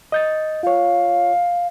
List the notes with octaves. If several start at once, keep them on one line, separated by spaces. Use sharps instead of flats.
D#5 G6 A6
F4 C#5 F5